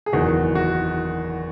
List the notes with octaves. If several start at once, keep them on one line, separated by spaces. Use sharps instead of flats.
G#4
F#1 E2 D#3 F#4
F#4